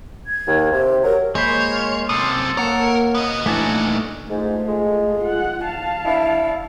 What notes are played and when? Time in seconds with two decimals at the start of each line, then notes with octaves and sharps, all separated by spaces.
0.27 G#6
0.47 D#2
0.72 C3 G4
1.04 F#3 A#4
1.35 G#3 A#3 C5 C#5 B5
1.72 F4
2.09 F#2 C3 A4 C6 D#6
2.57 A#3 A#4 C#5 F#5
3.15 B3 D#5
3.46 A#2 E3 A3 D4 D#4 F#4 G#5 A5
4.29 G#2 A3 F4
4.67 G#3
5.21 F4 F#5
5.65 F5 A5
6.05 D4 E4